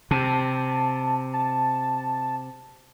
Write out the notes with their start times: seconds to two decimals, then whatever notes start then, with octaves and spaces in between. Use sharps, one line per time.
0.11 C3 A5
1.33 A5